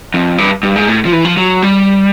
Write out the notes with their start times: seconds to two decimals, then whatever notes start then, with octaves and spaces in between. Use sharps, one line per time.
0.14 F2
0.38 G2
0.63 G2
0.76 G#2
0.88 A2
1.05 F3
1.12 E3
1.25 F3
1.37 F#3
1.62 G3